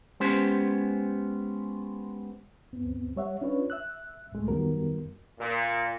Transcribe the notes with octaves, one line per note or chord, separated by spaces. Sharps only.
G#3 B3 C#4 G4 C5
D2 G2 B3 C4
G3 C#5 E5 F#5
C#4 D4 F4 B4 C#5
E5 E6 F#6
C#2 A2 G#3 A3
F#2 D#3 G3 B3 F#4 A#4
A#2